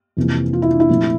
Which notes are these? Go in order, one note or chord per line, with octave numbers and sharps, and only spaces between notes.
F2 C3 E3 A#3
F4
E4
D4
E4
A#2 F3 A3 C4